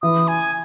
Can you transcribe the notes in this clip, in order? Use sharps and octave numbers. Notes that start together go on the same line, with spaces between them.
E3 D#6
G#5